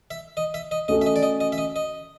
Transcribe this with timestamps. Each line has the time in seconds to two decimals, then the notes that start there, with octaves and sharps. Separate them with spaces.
0.11 E5
0.37 D#5
0.54 E5
0.71 D#5
0.88 A3 C#4 F#4 A4 D#5
1.01 E5
1.06 D#5
1.16 D5
1.23 D#5
1.41 D#5
1.52 E5
1.58 D#5
1.76 D#5